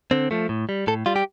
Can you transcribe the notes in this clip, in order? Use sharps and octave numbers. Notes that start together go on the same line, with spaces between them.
D3 C4
F3 A3
A2
G3
A2 A4
G3 F4
G4